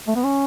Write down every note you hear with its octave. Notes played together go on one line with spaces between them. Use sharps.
A3
B3
C#4